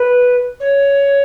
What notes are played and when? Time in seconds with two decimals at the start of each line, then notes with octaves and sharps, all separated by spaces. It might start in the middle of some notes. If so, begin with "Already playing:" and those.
Already playing: B4
0.60 C#5